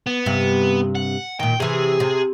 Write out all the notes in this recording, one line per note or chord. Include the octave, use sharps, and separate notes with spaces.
B3
G2 C3
F#5
A#2 D#3 G5
C3 E3 G#4
C3